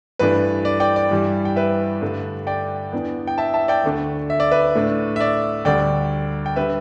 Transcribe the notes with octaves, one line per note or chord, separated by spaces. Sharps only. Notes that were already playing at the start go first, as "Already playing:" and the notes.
G2 E3 A3 D4 B4
D5
D5 G5
D5
G2 E3 G3
G5
B4 E5
G2 D3 A3 D4
D5 G5
E2 E3 B3 D4
G5
E5 A5
E5 A5
D5 G5
D2 D3 A3 D4
E5
D5
B4 E5
A2 A3 D4
E5
D5
D2 D3 G3 D4 D5 G5
G5
G3 D4 B4 E5